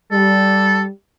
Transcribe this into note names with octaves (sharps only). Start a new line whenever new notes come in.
G3 A4